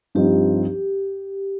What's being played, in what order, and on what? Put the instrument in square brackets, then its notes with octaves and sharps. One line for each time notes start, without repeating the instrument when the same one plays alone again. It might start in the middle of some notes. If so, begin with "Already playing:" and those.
[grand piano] G2 F3 C4 D#4 [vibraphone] G4